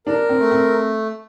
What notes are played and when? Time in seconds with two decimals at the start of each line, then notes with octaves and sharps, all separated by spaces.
0.06 D4 A#4
0.29 C4
0.40 A3
0.51 C4